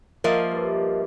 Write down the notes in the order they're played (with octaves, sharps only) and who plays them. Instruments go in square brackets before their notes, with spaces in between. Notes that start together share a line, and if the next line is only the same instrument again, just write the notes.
[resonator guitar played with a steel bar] F3 A#3 [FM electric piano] A#4 D#5 E5
[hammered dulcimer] G2 D5